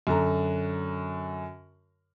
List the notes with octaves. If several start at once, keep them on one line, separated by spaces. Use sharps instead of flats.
F#2 D3 A#5